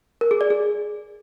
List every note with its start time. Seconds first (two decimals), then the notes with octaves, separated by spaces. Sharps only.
0.21 A#4
0.31 G#4
0.41 D5
0.50 G#4